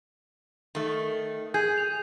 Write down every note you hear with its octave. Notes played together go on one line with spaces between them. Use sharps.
D#3 A3
G#4 G6 G#6
F7